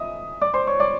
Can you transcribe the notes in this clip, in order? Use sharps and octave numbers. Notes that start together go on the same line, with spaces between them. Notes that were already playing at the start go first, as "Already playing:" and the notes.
Already playing: D#5 E5 D#6
D5 D6
C5 C6
C#5 C#6
D5 D6